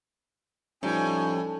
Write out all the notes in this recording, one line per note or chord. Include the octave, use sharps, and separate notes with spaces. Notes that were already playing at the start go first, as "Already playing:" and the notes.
A2 F3 G3 C#4 D#4 G#5